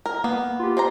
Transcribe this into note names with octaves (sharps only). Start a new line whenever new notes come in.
A#4
A#3 B3
F4 G4
C4 C5 A#5